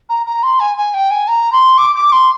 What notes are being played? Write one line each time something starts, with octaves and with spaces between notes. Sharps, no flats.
A#5
A#5
C6
G#5
G#5
G5
G#5
A#5
C6
D6
D6
C6